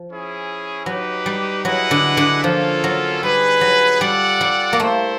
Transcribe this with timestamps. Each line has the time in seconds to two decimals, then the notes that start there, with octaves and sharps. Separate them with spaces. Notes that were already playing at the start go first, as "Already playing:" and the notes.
Already playing: F3
0.08 C#4 E4 G#4
0.86 F#3 D#4 G4 B4
1.26 G3
1.65 F#3 E4 G#4 B4 D#5 F#5
1.91 D3
2.17 D3
2.44 F3 A#3 C#4 F4 A4
2.84 F#3
3.23 G3 D#4 G#4 B4
3.61 F#3
4.01 G3 F4 A4 D5 F#5
4.41 G3
4.73 A#3
4.80 A3 E4 A4 C5